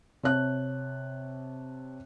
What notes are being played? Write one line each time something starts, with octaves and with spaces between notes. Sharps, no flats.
C3 C#5 A5 F#6